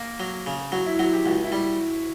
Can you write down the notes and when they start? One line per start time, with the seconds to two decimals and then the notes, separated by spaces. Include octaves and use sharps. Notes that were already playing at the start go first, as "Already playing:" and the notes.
Already playing: A#3
0.20 F#3
0.46 C#3
0.72 F#3 F#4
0.86 E4
0.99 F#3 F#4
1.13 G4
1.26 C#2 F#4
1.44 E4
1.52 G3